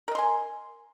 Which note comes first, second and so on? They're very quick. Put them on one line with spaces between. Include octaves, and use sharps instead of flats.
A#4 D#5 C6 G#5